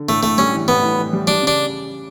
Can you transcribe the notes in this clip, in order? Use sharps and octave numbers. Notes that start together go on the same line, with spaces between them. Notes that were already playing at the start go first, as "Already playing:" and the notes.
Already playing: D3
A2 A3
A2 A3
G3 C#4
E3
A2 B3
A2
E3
G3
G3 D4
C#3 D4